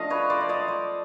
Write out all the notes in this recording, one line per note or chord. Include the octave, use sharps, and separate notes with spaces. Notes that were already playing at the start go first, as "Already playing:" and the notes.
Already playing: F3 A3 D4 D#5 F5
B4 C#5
C5 D5
D5
C#5 D#5
C5 D5